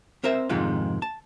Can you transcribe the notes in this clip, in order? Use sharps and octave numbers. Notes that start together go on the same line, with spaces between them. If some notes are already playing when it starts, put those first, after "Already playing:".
C4 A#4 C5 E5
F2 G#2 C3 D#3 G#3 F4
A5